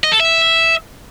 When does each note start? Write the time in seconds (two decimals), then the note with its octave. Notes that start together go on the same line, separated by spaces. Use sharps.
0.04 D#5
0.12 A4
0.20 E5